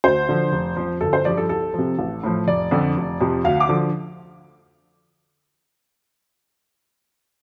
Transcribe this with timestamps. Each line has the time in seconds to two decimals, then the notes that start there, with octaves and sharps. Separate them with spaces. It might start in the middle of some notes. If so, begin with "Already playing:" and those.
0.04 D2 C5
0.29 D3 F3
0.52 F1
0.77 F2 F3
1.01 G1 A4
1.13 C5
1.25 G2 F3 D5
1.37 A4
1.49 C2 A4
1.74 C3 F3
1.99 A1
2.23 A2 F3
2.47 F1 D5
2.71 F2 D3
2.97 F1
3.21 F2 C3 F3
3.44 D2 F5
3.60 D6
3.69 D3 F3